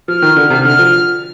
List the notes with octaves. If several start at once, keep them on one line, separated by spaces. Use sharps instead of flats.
F3 F6
D#3
D3
C3
D3 F6
F3